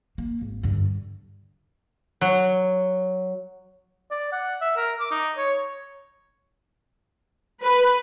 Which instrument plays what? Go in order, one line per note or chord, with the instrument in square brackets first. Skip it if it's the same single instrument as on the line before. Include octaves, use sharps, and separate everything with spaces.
[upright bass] A#3
G#1
G2 D3
[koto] F#3
[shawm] D5
F#5
E5
A#4
D6
D#4
C#5
[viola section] B4